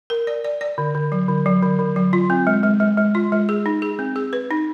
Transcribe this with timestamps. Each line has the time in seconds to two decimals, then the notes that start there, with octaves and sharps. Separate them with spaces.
0.10 A#4
0.27 D5
0.45 D5
0.61 D5
0.78 D3
0.95 D3
1.12 F#3
1.28 D3
1.46 F#3
1.62 D3
1.79 D3
1.96 F#3
2.13 F4
2.30 C4
2.47 G#3
2.63 G#3
2.80 G#3
2.98 G#3
3.15 F4
3.32 G#3
3.49 G#4
3.66 D#4
3.82 G#4
3.99 C4
4.16 G#4
4.33 B4
4.51 D#4